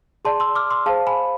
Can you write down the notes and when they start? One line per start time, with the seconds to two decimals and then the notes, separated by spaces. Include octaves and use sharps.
0.25 G#4 D5 A5 C6
0.40 C6 E6
0.55 D6 F6
0.71 C6 E6
0.86 G#4 F5 A5
0.89 C5
1.07 G#5 B5